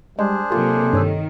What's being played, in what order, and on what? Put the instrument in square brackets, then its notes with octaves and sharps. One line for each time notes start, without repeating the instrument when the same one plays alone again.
[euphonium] G3 [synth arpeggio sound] G#3 [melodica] D4 G#4 C5
[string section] C3 F#3 A#3 [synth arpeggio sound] F4 G4 [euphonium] A4
[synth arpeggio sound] G2 C#5 E6 [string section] D#3